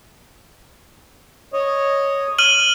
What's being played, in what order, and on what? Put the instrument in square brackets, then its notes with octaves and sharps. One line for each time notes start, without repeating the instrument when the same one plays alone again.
[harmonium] C#5 D#5
[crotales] F6 D#7 F#7